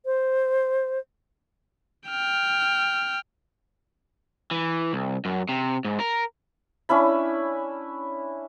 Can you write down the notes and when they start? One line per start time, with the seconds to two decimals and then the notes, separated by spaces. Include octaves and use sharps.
0.05 C5
2.08 G5 F6
4.51 E3
4.93 C2
5.25 F#2
5.49 C3
5.85 G#2
6.00 A#4
6.89 C#4 D4 E4 B5